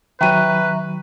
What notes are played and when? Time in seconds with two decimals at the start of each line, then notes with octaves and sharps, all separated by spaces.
0.21 D#3 F#3 B4 E5 G5 A#5 C#6 D#7